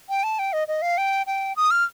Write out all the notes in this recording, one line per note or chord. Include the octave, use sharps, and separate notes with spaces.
G5
A5
G5
D#5
D#5
F5
G5
G5
D#6
F6